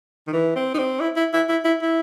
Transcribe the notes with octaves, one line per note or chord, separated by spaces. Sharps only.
D#3
E3
C4
D#4
C4
E4
E4
E4
E4
E4
E4